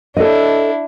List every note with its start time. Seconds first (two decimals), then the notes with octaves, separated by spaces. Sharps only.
0.17 D4 E4 A4 C#5 D#5